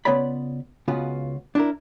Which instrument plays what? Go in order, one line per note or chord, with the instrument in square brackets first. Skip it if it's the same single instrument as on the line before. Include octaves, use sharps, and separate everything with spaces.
[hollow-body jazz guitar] C#3 B3 F4 C#5 D5 B5
C#2 C#3 B3 F4 F#4
D4 E4 A#4